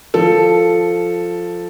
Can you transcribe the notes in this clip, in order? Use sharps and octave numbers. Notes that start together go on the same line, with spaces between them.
F3 A4